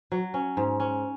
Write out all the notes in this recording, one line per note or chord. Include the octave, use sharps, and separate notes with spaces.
F#3
C#4
G#2
C#4